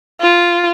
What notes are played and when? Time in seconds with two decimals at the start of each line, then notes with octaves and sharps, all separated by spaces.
0.21 F4